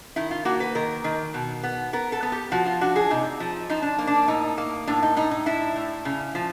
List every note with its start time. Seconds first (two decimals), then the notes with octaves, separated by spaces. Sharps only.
0.16 D#3 E4
0.31 F4
0.45 A#3 F#4
0.60 B4
0.75 D#3 A#4
1.04 D#3
1.34 B2
1.63 B3
1.93 B3 A#4
2.12 A4
2.23 B3
2.32 G4
2.52 F3 F#4
2.66 F4
2.81 D4 F#4
2.96 G#4
3.10 C3 D#4
3.40 F3
3.69 F3 D#4
3.82 D4
3.98 A#3
4.07 D4
4.28 A2 D#4
4.58 A#3
4.87 A2 D4
5.02 D#4
5.16 A2 D#4
5.31 D#4
5.46 D4 E4
5.76 A2
6.05 C#3
6.35 F3